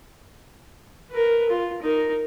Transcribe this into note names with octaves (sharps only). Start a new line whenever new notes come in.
A#4 B4
F4
D#4 A#4